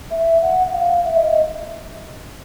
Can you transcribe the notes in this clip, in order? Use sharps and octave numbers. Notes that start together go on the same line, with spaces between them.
E5
F#5
F#5
F5
E5
D#5